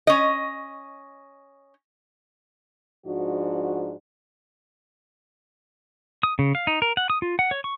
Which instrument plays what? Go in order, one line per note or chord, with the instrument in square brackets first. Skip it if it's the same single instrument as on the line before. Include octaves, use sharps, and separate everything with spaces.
[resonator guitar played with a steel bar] C#4 D#5
[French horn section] G#2 F3 D4 F#4
[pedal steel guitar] D#6
C#3
F5
D#4
A#4
F#5
D#6
F4
F#5
C#5
C#6